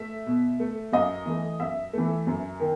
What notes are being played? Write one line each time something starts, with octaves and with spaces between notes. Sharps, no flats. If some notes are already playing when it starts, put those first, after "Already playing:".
Already playing: A3 E5
B2
A3
F#2 D#5
E3 A3
F#2 E5
E3 A3
F#2
D#3